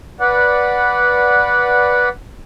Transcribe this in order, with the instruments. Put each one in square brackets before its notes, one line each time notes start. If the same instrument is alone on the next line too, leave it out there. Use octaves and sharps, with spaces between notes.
[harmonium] B4 D5 F#5